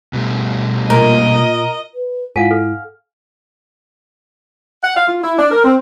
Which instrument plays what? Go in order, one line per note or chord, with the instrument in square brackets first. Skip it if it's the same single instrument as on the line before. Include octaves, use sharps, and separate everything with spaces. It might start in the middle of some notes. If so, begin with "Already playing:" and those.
[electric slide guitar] B2 G3 A3
[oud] A#2 [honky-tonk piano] A#4 [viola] D#5
[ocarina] B4
[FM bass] G#2 [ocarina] E4 [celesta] F4 B6 D#7 [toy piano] F5 F#5 G#5
[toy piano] A4 [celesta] F6
[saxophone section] F#5
F5
F4
E4
D4
A#4
C4